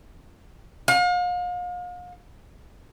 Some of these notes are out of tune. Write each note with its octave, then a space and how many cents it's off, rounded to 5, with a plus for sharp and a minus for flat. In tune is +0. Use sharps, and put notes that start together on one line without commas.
F5 +40